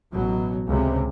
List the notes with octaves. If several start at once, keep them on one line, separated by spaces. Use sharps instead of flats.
A1 B2 F#3
C#2 C3